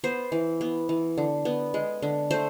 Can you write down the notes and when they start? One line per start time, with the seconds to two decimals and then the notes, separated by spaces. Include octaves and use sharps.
0.04 B3 C5
0.32 E3
0.61 B3
0.89 E3
1.18 D3
1.45 B3
1.74 G#3
2.02 D3
2.31 A3 C5